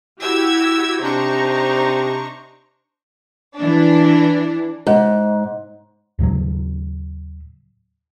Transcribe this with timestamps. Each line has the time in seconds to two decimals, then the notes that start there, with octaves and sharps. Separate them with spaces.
0.21 E4 F#4 G4 E6 G#6
1.02 C3 D4 D#4 C5 A#5 C#6
3.57 E3 D4
4.87 G#2
6.19 D#2 A2 C#3 F#3